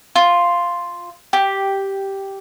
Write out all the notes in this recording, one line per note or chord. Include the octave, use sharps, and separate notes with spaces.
F4
G4